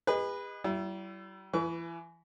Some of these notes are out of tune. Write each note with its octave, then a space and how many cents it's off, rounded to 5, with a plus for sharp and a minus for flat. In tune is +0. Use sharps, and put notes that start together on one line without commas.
G#4 -40 B4 -5 D#5 +0
G3 -40 E4 +20
E3 +30 B4 +0 C#6 +45